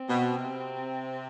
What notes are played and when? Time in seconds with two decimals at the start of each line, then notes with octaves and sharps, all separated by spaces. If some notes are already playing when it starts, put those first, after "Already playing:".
Already playing: C4
0.09 B2
0.35 C3